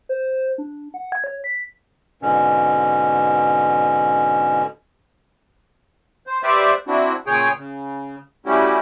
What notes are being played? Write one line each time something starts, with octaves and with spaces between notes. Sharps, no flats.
C5
D4
F#5
G#6
C#5
B6
G#2 B2 D3 C#4
C5
G4 B4 C5 D5 E5
C4 D4 E4 F#4
A#2 C#3 G#4 C#5 G5
C#3
G3 A3 C#4 E4 F#4 G4